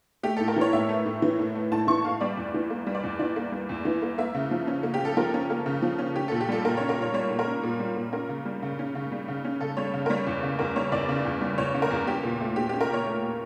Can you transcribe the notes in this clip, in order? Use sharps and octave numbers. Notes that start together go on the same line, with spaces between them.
A3 G4
A2 A4
A#4
E3 C#5
A2 E5
A3
A2
E3
A2
A3
A2 A5
E3 C#6
A2 F5
G3 D5
E2
E3
A#3
G3
D5
E2
E3 D5
A#3
G3
E2
E3
A#3
A#3 E5
C#3
F3
C#4
A#3
G4
C#3 A4
F3 A#4
C#4
A#3
C#3
F3
C#4
C#4 G4
A#2 A4
G4
G3 A4
A#2 A#4
C#4 C#5
A#4
A#2 C#5
G3 C#5
A#2
A#4
C#4
A#2
G3
A#2
C#4 A#4
C#3
G3
C#3
C#4
C#3
G3
C#3
C#4
C#3 A4
G3 C#5
C#3
A#4
G3 C#5
E2
C#3
E2 A#4
G3 C#5
E2 D5
C#3
E2
G3
E2 C#5
C#3
A#4
E2
C#4 G4
A#2
A3
A#2 G4
C#4 G4
A#4
A#2 C#5
A3
A#2